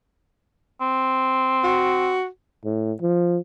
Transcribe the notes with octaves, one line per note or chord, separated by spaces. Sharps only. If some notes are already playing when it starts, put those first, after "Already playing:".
C4
F#4
A2
F3